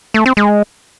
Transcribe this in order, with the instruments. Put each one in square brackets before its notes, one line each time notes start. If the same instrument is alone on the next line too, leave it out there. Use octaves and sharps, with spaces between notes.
[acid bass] A3
C4
G#3